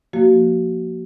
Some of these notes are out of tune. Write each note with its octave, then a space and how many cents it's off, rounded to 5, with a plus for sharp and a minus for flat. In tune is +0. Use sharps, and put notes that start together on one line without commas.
F3 +10 A#3 +0 F#4 +30